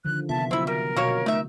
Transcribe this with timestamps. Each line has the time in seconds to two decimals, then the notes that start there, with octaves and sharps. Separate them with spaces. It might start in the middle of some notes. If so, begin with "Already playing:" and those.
0.05 D3 D#3 F3 F#6
0.29 C3 B3 F4 E5 A5
0.51 F#3 C4 E4 E6
0.67 G3 A#4
0.96 B2 A#3 F#4 C#5
1.26 A3 D#4 E5